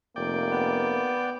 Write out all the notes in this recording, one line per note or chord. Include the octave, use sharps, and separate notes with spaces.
F1 A#3 D5 G5
B3